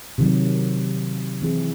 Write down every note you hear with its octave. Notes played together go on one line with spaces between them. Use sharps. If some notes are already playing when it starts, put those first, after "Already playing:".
C3 D#3 F#3
E3 C4 E4 G#4